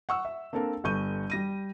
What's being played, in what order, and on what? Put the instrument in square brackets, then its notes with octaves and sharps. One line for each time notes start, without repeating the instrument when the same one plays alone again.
[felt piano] F#5 C#6 E6
E5
A#3 C4 D4 A4 A#4
G1 A4 C#6 G6 D#7
G3 A#6 D#7